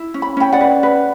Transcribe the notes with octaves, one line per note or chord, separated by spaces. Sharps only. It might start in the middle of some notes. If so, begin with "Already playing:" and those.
Already playing: E4
C#4
B5
C#4 G5 B5
D5 F#5
B4
B4